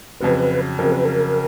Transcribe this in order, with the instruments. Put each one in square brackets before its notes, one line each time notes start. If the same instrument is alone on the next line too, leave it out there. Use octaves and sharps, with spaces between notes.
[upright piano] F2 C#3 F#3 [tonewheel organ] B4
[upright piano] F2 C#3 F#3 [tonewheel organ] A#4
[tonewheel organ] B4
A#4